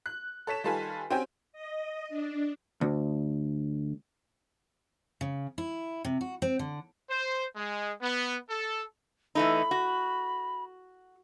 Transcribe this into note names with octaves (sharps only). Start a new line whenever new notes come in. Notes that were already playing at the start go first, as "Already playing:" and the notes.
F#6
A4 C#5 B6 E7
D#3 G3 F4 A4 B4 G#5
C4 C#4 F#4 G4 G5 G#5
D#5
D4
D2
C#3
E4
C3
F#4
C4
D3
C5
G#3
B3
A4
E3 A3 D#4 B5
F#4